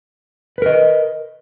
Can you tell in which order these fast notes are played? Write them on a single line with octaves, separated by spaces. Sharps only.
B4 A#4 D#5